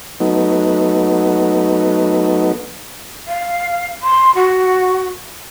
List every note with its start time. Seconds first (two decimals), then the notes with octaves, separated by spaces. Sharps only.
0.20 F#3 A3 B3 D#4
3.27 F5
4.02 C6
4.35 F#4